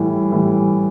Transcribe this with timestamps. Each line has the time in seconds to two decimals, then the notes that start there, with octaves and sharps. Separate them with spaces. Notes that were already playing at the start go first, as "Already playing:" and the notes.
Already playing: A2 E3 G3
0.32 A2 E3 G3